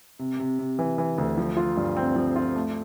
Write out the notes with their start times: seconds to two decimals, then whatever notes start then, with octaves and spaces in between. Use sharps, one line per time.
0.19 C3
0.39 C3
0.59 C3
0.79 E3
0.98 E3
1.18 D2
1.38 F3
1.57 F4
1.77 G2
1.97 C4
2.16 F3
2.36 F4
2.55 A3